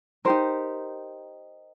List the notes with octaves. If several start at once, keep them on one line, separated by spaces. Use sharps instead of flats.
D#4 G4 A#4 C5